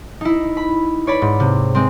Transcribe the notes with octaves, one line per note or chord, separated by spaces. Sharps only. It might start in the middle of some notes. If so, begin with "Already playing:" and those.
D#4 E4
B5
C#5 D5 B5
G#2
C3
G#3 C4